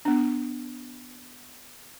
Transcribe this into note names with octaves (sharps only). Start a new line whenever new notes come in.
B3 D4